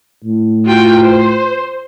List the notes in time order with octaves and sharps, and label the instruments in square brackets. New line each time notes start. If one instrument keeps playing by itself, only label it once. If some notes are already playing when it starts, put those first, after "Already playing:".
[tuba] A2
[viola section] F4 F#4 G5
C5